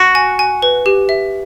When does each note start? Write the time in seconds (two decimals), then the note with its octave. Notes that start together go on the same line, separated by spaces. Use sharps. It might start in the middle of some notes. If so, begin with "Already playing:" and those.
Already playing: F#4 C#6
0.15 G#5
0.39 G#5
0.62 B4
0.86 G4
1.09 E5